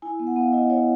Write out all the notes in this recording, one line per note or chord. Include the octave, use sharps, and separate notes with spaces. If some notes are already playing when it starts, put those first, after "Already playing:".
E4 G#5
B3
F#5
B3 F5
E4 D#5
E4 C#5